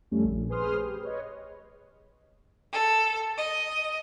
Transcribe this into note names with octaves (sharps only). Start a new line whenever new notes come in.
F2 G3 A3 C#4
A#1
G#4 B4 C5 C6 D#6 F6
G4
B4 C#5 D#5
A4
D#5